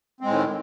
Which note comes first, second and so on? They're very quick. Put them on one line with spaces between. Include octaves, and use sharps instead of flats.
C4 G#3 A2 D#3